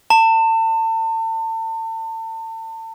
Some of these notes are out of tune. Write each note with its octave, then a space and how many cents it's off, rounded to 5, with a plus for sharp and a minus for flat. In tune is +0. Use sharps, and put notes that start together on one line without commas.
A5 +35